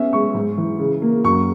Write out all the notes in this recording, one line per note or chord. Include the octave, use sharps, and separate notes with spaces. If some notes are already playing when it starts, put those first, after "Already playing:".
Already playing: B3 C#4 E5
G#3 C#6
G#2
E3
C#3
A#3
F#2 C#6